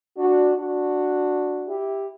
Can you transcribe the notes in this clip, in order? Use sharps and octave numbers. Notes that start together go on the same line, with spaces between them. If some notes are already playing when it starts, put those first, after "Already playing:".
D4 F#4
D4 F#4
E4 G4